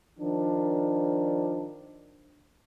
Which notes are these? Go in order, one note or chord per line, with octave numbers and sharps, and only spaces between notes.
D#3 F3 D4